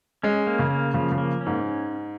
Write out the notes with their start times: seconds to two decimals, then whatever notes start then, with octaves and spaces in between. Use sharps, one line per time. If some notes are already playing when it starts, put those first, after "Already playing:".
0.23 G#3 C#4
0.47 A#3
0.59 C#3
0.71 A#3
0.94 C#3 F3
1.12 C#3
1.18 A#3
1.41 C#4
1.46 G#2